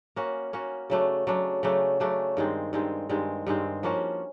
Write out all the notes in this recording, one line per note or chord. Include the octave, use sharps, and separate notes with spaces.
A#3 C#4 F#4
A#3 C#4 F#4
C#3 F#3 A3 D4
C#3 F#3 A3 D4
C#3 F#3 A3 D4
C#3 F#3 A3 D4
G2 D#3 G#3 C4
G2 D#3 G#3 C4
G2 D#3 G#3 C4
G2 D#3 G#3 C4
F3 A#3 C#4 F#4